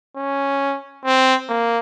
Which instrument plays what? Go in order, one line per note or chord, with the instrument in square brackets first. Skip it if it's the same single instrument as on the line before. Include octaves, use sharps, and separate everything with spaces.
[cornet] C#4
C4
A#3